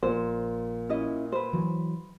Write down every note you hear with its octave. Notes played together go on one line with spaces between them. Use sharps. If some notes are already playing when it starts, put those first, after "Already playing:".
A#1 A#2 C5
C#4 E4 D#5
B4 C5
E3 F#3